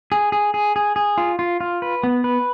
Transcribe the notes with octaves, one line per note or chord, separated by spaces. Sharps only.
G#4
G#4
G#4
G#4
G#4
F4
F4
F4
B4
B3
B4